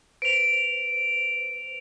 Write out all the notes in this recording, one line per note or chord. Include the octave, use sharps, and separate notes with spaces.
B4 C5 D7 F7